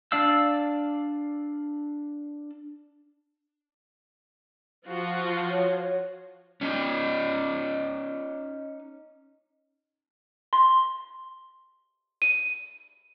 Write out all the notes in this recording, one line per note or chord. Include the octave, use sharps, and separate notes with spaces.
D4 D5 F5 E6
F3 F4 F#4
C#5
C#4 D#4
C6
D#7